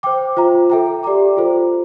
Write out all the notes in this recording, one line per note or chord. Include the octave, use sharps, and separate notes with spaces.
C5 G5 D6
F4 C5 E5 A#5
A4 E5 G5 A#5
G4 D5 G5 A#5 D6
F4 A4 C5